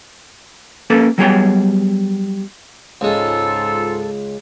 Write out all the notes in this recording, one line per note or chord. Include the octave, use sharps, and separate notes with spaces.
A#3 C#4 A4 B4
F#3 G3 B3 G#4 C#5 G5
C#2 G#2 G#3 F4 A4